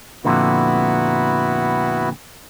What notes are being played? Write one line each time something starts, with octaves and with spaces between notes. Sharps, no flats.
F2 A#2 D3 B3 E4 F#4